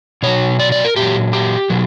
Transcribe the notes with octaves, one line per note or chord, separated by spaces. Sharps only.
B2 F#3 C#5
D5
D5
A#4
A#2 F#3 G4
G4
B2 F#3